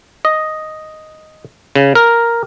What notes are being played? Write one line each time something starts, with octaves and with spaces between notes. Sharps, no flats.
D#5
C#3
A#4